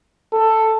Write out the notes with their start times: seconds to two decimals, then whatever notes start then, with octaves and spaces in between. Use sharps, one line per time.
0.33 A4